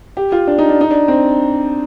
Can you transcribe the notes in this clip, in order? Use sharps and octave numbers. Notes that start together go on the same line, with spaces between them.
G4
F4
D4
D#4
D4
D#4
D4
C4